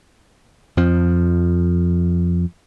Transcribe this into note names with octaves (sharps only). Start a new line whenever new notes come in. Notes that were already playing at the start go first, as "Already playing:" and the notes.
F2 F3